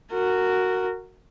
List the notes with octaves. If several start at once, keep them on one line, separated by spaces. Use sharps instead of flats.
F#4 A#4